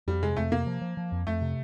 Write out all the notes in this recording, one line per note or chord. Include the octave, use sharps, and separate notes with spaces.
F2 G3
C3 G#3
F2 A3
C3 A#3
F3
F3
F3
F2
F2 A3
C3